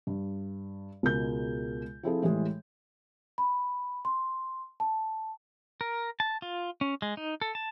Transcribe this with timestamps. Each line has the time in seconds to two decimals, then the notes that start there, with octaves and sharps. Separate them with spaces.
0.07 G2
1.03 C#2 B2 G#3 A#4 G6
2.03 F3 C4 E4 F4 G#4 A4
2.23 A2 E3 G3 G#3 G#4
3.38 B5
4.05 C6
4.80 A5
5.81 A#4
6.20 A5
6.42 F4
6.81 C#4
7.02 G#3
7.17 D#4
7.42 A4
7.55 A5